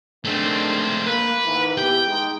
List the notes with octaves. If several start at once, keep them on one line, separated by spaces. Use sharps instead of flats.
D#3 G#3 A3 C4 D4
A#3 B4
G#2 D#3 E3
E3 B3 G4 G5
G#3 D#4